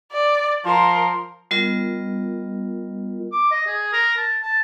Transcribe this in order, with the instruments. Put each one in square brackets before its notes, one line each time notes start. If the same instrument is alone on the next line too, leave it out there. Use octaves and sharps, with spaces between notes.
[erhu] D5
[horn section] F3 C5 C6 [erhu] A#4
[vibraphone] G3 B3 F4 A#4 D#5
[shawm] D6
D#5
G#4
A#4
A5
A5